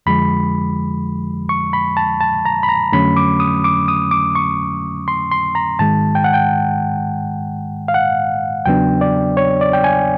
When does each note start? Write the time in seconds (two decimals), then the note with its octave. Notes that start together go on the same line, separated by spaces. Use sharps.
0.06 F2 D3 F3 G#3 B5
1.49 C#6
1.73 B5
1.97 A5
2.21 A5
2.45 A#5
2.63 B5
2.69 A#5
2.92 F2 D3 F#3 A3 C#4 B5
3.17 D6
3.40 D#6
3.64 D6
3.88 D#6
4.11 D6
4.35 C#6
5.08 C6
5.31 C6
5.55 A#5
5.79 G#2 D#3 G#3 A5
6.15 G5
6.24 F#5
6.34 G5
7.88 F5
7.94 F#5
8.66 E2 C#3 F#3 B3 D4 G5
9.01 D5
9.37 C#5
9.61 D5
9.73 G5
9.84 G#5